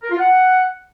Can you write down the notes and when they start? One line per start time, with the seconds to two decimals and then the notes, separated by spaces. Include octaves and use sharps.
0.02 A#4
0.11 F4
0.19 F#5